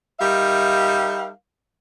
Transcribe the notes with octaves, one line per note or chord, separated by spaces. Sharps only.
G3 D#4 A#4 E5 F5